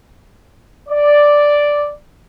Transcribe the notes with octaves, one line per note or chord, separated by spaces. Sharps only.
D5